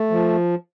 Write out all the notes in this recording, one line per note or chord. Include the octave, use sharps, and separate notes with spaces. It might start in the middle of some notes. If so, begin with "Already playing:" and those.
Already playing: A3
F3